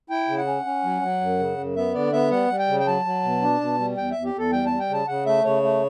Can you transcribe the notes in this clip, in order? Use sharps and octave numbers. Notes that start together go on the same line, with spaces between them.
E4 G5
C#3
F#5
C#4
C#4
F#3
F#3
F#2
C#3
F#2
B3 E5
D3 D5
B3 E5
G3 F#5
G3
G5
C#3
G5
F#3 A5
F#3
B2
D4
B2
G3
E2 G5
E2 E5
G4
E2 A4
G3 G5
G3 A5
G5
C#3 A5
C#3 F#5
A3 E5
C#3 C#5
A3